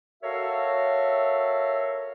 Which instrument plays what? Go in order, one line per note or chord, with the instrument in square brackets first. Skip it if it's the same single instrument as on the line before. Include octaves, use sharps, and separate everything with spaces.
[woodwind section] F#4 A4 A#4 C#5 E5 F5